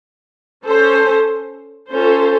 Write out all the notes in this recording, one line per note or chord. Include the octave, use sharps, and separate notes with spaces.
C#4 A4 C5
C#4 F4 A4 C5